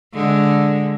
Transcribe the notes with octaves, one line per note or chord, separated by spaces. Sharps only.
D3 G#3